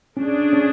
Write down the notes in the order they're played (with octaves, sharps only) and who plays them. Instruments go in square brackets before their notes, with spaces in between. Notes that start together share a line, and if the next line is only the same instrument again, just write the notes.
[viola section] A3 D4 G#4 [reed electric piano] C#4
[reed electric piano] C#4